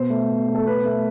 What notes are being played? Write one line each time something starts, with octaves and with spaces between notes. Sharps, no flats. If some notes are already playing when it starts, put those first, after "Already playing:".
Already playing: B2 C5
A3
B2
A3
A4
B2 B4
A3